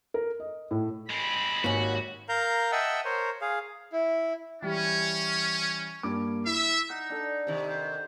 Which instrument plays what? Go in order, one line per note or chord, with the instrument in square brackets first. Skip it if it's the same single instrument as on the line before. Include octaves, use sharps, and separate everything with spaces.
[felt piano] A#4
D#5
A2
[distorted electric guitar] G#3 C4 [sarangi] B5
[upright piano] G#1 [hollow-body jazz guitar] D#2 C#4 [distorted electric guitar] F#4
[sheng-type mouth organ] A#4 F5 A#5 G6
D#5 E5 F#5 G5 A5 E6
A#4 C5 C#5
G#4 F5
E4
[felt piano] E3 G3 [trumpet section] C#4
[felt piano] G2 A#3 D6
[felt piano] E4 [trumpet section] E5
[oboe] D#4 [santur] F#5
[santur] D4 A4
[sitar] C3 D#3
[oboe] C5